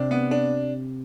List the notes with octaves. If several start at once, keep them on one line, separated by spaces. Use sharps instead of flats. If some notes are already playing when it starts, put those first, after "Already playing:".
Already playing: C3 D4
B3
D4